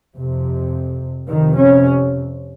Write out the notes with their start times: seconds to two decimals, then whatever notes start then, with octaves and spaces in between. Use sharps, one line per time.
0.16 F2 C3
1.28 F2 C3 D#3
1.57 C#4